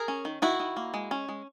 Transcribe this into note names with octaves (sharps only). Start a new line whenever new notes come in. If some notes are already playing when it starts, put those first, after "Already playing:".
Already playing: G#4 A#4
C#4
D#3
D#3 E4 F#4
D#3
A#3
G#3
C#4
G#3